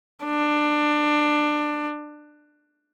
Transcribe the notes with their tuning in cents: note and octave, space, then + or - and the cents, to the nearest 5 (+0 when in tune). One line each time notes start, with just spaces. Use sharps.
D4 +20